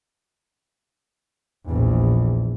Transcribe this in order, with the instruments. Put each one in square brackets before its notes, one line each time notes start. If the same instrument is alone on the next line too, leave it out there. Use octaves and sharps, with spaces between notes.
[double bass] A#1 E2